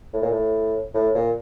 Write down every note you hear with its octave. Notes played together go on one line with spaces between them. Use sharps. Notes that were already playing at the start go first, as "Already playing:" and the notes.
A2
A#2
A2
A2
A#2